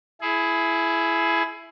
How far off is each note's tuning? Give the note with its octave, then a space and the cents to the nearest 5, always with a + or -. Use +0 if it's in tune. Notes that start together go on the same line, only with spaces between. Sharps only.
E4 +10 G#4 +25